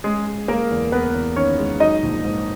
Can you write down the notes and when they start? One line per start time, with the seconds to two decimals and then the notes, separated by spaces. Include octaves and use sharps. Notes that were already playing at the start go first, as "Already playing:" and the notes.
0.04 G#3 C#4 G#4
0.27 G#3
0.48 G#3 A#3 A#4
0.71 E2
0.92 E2 B3 B4
1.15 E2
1.36 D#3 C#4 C#5
1.59 G#3
1.80 F#3 D#4 D#5
2.03 A#1
2.24 G#2